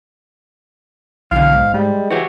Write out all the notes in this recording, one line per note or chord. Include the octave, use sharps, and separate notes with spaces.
B1 D3 E3 F5
G#2
G3 G#3
E3 F#4 G4 C#5